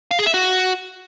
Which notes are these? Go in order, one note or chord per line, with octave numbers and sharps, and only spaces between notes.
F5
G#4
E5
F#4